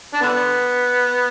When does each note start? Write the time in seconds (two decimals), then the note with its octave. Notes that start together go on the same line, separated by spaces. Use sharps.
0.14 D4
0.22 D3 B3